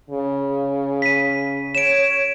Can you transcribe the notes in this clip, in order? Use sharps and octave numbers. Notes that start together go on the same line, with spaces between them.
C#3
B6 D#7
C#5 D7 E7